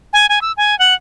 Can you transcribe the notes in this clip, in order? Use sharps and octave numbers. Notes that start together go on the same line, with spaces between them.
G#5
G#5
E6
G#5
F#5